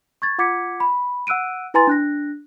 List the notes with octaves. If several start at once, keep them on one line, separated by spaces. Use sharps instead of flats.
C#6 G#6 A6
F4 F#5 D6 G#6 B6 C#7
B5
F#5 E6 F#6 D7 D#7
E4 B4 G#5 A#5 C6 A6
D4 F#6 A#6